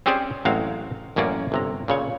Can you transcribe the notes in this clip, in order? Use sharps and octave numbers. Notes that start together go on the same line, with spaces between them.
C4 C#4 G4 G#4 C5 D5
A1 F#3 G#3 C4 F#4 F5
A1 F#2 A#3 C#4 D5
G1 C3 A#5
A#2 C#3 C#5